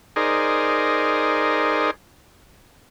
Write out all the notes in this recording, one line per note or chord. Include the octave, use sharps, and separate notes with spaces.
D#4 G#4 A#4 C5 D5